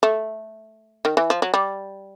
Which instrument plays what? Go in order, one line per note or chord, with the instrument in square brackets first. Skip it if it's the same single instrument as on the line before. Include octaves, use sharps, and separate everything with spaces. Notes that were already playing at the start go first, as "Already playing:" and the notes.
[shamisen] A3
D#3
E3
F3
F#3
G3